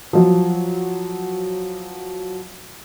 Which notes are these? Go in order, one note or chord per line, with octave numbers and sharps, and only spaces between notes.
F3 F#3